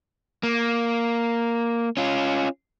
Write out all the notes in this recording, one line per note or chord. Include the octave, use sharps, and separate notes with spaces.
A#3
C#4 F4